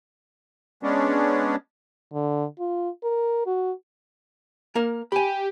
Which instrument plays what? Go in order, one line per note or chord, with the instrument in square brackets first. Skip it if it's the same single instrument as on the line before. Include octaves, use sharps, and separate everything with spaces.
[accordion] G#3 B3 C#4 D4
[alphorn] D3
F4
A#4
F#4
[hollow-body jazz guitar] A#3 A#4
[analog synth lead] G4 [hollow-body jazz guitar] G#5 B5